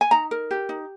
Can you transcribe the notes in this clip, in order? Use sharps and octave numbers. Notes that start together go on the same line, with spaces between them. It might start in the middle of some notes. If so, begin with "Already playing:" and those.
G#5
D#4 A#5
A#4
G4
D#4